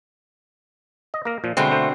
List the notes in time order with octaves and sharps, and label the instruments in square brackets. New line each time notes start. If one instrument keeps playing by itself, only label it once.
[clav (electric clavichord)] D#5
A#3 A#4
A#2 F3
[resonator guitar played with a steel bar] B2 D3 C4 [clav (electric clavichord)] G#3 A3
[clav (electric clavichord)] A3 C5